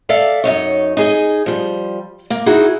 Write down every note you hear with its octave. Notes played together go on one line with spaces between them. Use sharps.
A4 D5 E5 F5
F#2 D#4 C#5
D#4 G#4 D#5
F3 G3
A#3
D#4 E4 F#4 G#4